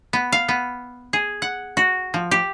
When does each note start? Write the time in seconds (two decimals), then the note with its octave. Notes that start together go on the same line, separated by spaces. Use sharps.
0.13 B3
0.32 F5
0.48 B3
1.13 G#4
1.42 F#5
1.77 F#4
2.14 F3
2.31 G4